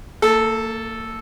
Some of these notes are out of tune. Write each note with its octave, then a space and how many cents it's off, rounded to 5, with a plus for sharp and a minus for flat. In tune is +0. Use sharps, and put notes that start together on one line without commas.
A#3 -35 A4 -5